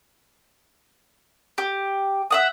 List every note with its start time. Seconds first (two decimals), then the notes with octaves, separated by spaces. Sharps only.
1.58 G4
2.30 E5 F#5 D#6